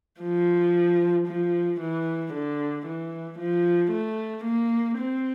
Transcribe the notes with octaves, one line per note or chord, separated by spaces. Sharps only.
F3
F3
E3
D3
E3
F3
A3
A#3
C4